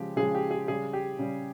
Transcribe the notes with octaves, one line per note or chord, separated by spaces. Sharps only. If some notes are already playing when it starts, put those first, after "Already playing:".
Already playing: C#3 F3 G#3 G4
C#3 F3 G#3 G#4
G4
G#4
C#3 G3 G#4
G4
C#3 G3